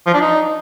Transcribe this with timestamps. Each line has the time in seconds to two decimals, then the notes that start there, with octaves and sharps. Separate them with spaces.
0.07 F3
0.14 D4
0.21 D#4